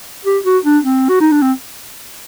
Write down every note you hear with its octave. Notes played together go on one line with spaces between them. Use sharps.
G4
F#4
D4
C4
F#4
D#4
D4
C4